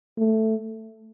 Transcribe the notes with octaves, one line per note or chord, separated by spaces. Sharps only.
A3